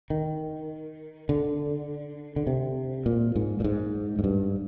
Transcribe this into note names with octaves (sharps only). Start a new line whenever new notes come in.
D#3
D3
D3
C3
A#2
G#2
A#2
G#2
G#2
G2